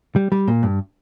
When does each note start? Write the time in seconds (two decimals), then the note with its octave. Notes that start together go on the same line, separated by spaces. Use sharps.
0.16 G3
0.32 G3
0.48 A#2
0.63 G2